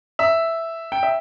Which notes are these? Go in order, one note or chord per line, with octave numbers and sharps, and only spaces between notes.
E5
G5
E5